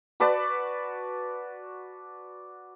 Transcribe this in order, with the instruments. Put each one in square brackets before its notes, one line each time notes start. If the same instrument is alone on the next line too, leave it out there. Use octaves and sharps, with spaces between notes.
[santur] F#4 B4 D5 A5